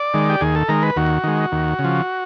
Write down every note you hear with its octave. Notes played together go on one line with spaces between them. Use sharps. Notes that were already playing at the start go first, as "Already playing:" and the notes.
Already playing: D5
D#3 G#3
G4
D#2 G#4
A4
D#3 G#3 A#4
B4
D#2 F#4
D#3 G#3
D#2
C#3
F3